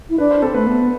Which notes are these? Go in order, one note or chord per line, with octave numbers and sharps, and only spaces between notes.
E4
D4 B4
C5
C4 A4
A3 B4
B3